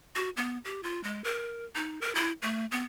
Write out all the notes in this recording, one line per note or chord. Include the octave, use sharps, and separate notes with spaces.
F#4
B3
G4
F4
G#3
A#4
D#4
A#4
E4
A3
B3